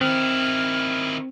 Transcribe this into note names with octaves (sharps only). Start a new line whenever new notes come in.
D#3 C4 E4 F6